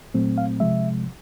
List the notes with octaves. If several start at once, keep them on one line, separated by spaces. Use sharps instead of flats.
A#2 F#3 A3 C4
F5
C3 F3 G#3 E5